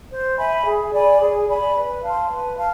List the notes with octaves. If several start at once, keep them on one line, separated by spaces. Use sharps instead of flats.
C5
E5 G#5 B5
G#4
D5 G#5 B5
G#4
D5 G#5 B5
B4
F5 A5 C6
B4
F5 A5